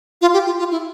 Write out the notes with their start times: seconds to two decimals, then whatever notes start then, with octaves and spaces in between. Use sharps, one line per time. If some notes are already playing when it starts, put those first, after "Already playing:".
0.22 F4
0.34 G4
0.46 F4
0.59 F4
0.71 E4